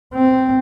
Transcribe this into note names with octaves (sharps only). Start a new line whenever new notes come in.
C4